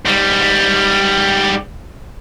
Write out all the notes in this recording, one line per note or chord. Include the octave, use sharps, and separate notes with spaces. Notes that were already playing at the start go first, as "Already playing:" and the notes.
G#2 G3